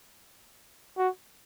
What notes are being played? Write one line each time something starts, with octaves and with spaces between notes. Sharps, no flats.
F#4